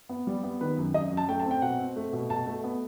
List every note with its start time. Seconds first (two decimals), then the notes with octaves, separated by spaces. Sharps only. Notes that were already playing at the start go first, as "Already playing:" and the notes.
0.09 B3
0.27 G3
0.44 B3
0.61 D#3 B4
0.78 F#2
0.94 F#2 D#5
1.11 F#2
1.17 A5
1.29 A3 G5
1.40 A5
1.45 C4
1.51 G5
1.62 B2 F#5
1.79 C4
1.96 A3
2.13 B2
2.30 B2 A5
2.46 A3
2.64 B3